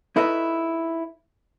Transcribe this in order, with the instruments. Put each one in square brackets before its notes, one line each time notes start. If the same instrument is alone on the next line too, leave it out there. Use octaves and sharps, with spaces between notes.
[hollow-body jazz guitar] D#4 E4 A4 B4 C#5 D#5